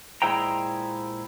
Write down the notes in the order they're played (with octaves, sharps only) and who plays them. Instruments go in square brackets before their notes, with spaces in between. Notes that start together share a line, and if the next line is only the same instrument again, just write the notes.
[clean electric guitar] A#2 G#3 E4 C5 G5 A#5